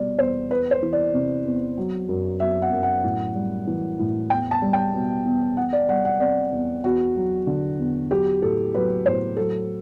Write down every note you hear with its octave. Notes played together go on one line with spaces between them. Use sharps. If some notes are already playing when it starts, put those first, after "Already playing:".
Already playing: B2 G3 D5
E2 C5
E2 B4
C5
E3
D5
C3
E2
F#3
F#2
F#3 E5
F#5
F#2
F#5
A2
G3
E3
A2
E2 G5
A5
G3
G5
B2
E2
E2 F#5
D5
G3 F#5
F#5
C3 D5
E2
E2 F#4
F#3
D3
E2
F#3 G4
A2 A4
F#3 B4
A2 C5
F#3 A4